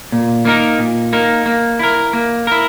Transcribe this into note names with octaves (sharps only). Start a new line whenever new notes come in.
A#2
A#3 D#4 A#4
A#2
A#3 D#4 A#4
A#3
E4 A#4
A#3
E4 A#4